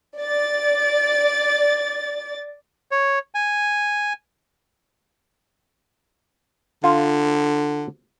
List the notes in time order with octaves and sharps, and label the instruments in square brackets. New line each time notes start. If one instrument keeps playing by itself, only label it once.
[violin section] D5 A6
[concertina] C#5
G#5
[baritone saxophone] D3 [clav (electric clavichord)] F4